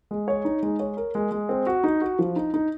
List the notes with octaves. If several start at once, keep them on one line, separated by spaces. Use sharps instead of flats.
G#3
C#5
D#4
G#3
C#5
A#4
G#3
G#3
C4
F#4
D#4
F#4
F3
D#4
D#4